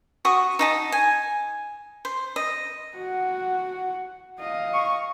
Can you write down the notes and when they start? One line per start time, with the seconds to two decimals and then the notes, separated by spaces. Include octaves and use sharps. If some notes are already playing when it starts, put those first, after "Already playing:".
0.25 F#4 C#6 D#6
0.59 D#4 D#5 A5
0.92 G#5
2.05 C5
2.36 D#5
2.95 F#4 F#5
4.40 D#5 F5
4.73 C#6